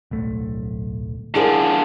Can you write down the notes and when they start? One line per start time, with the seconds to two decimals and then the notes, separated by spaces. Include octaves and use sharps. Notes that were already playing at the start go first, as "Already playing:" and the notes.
0.11 D1 B1 A3
1.35 D3 F3 E4 G#4 A#4